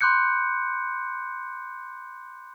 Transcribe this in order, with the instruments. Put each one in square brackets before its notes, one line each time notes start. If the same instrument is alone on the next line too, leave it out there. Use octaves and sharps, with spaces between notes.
[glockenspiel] B5 C6 D6 F#6 G6 C#7